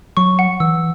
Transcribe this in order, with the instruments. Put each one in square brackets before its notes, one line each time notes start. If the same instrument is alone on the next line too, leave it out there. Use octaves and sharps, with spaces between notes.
[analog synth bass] F#3 [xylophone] C#6
[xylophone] F#5
[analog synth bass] E3 [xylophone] E6